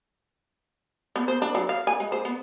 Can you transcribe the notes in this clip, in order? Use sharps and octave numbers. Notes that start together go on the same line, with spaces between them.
B3
C5
D4
F#3
F5
G#5
G#3
C5
B3